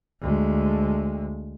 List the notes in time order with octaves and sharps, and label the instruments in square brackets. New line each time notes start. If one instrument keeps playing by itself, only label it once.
[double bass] D2 G#3